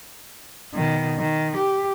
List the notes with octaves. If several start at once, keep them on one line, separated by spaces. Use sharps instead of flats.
B2 D#3
D#3
G4